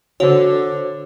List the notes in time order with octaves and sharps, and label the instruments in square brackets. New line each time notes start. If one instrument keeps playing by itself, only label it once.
[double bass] D3 [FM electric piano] F#4 C5 [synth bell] C#5